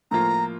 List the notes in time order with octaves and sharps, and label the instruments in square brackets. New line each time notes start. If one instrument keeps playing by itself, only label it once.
[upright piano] A2 F3 A#3 F4 [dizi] A#5